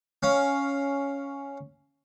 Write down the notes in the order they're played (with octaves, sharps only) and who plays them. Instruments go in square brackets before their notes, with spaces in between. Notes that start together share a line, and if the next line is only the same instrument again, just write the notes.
[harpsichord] C#4 F5